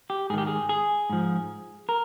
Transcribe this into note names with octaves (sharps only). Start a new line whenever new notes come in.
G4
G#2 D#3 G4 G#4
G#4
G#4
G#2 F3
A#4